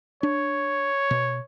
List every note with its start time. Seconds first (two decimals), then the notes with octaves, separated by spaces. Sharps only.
0.23 D4 C#5
1.11 B2